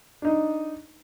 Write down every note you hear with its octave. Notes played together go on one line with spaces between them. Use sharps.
D4 D#4